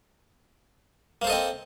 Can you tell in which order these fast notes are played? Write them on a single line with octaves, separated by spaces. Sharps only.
A#3 C5 A4 D#5 C4